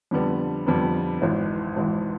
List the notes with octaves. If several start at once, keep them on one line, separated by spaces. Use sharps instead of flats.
F2 D3 G3 B3
F2 D3 G3 B3
G#1 G#2 E3
G#1 G#2 E3